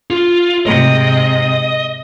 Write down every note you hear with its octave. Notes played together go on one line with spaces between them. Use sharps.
F4
G#2 C3 D#5